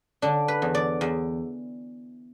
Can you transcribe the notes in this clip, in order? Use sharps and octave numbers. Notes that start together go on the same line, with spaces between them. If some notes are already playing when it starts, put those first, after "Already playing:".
D3 D4
B4
E2
D5
E2